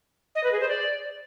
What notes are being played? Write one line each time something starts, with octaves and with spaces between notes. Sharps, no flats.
D#5
B4
G#4
C5
D5